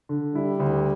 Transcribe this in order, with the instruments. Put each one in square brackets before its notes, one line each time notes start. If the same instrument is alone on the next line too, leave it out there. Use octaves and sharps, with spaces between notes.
[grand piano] D3
[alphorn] G3 [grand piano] E4
[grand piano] D2